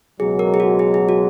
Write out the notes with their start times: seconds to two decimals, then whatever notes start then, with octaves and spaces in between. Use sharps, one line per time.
0.20 C#2 B2 F#3 G#4
0.39 A#4
0.54 G#4
0.60 F#4
0.79 G#4
0.94 G#4
1.09 F#4